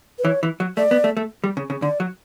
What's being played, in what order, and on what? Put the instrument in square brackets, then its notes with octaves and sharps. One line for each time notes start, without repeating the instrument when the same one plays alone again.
[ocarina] B4
[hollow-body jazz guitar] E3 [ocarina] C#5
[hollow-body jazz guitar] E3
F#3
[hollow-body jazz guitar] A3 [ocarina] D5
[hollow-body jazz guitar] B3
A3
A3
G3
C#3
C#3
[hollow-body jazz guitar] D3 [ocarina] D5
[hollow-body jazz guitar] F#3